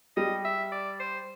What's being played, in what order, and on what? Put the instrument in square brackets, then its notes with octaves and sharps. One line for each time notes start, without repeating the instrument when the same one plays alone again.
[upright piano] G3 [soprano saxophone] D#5
[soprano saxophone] E5
D5
C5